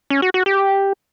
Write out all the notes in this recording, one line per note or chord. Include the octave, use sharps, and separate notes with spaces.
C#4
F#4
F#4
G4